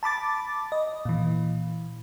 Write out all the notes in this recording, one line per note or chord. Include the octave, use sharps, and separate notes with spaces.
A5 B5 D6 A6
D#5
A#2 E3